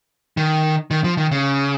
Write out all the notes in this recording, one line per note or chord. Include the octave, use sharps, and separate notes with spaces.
D#3
D#3
F3
D#3
C#3